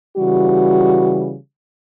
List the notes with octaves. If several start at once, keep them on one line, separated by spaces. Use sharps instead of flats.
C#3 E3 G3 F#4